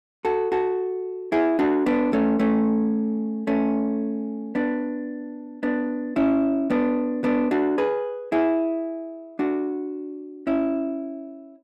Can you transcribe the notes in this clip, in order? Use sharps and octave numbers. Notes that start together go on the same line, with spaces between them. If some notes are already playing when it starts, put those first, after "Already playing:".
F#4 A4
F#4 A4
E4 G#4
D4 F#4
B3 D4
A3 C#4
A3 C#4
A3 C#4
B3 D4
B3 D4
C#4 E4
B3 D4
B3 D4
D4 F#4
G#4 B4
E4 G#4
D4 F#4
C#4 E4